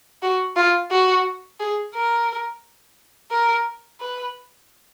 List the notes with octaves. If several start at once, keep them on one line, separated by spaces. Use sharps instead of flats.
F#4
F4
F#4
G#4
A#4
A#4
B4